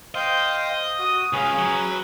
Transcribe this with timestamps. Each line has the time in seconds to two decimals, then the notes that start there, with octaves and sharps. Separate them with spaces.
0.15 C5 D#5 F5 G5
0.99 F#4 D#6
1.33 C#2 C#4 G#4 B4 F5
1.58 F#3